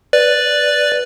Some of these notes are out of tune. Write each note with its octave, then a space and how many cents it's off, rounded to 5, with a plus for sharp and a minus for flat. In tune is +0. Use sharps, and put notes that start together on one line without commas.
B4 +0 D5 +0